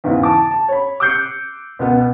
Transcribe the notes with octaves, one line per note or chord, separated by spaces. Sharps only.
E2 G#2 C#3 E3
A5 D6
A5
C#5 B5
D6 E6 F#6 G6 C7 C#7
C#2 B2 B3